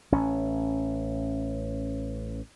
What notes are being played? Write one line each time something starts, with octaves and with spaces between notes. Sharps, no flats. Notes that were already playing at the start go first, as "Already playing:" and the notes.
A1 C#4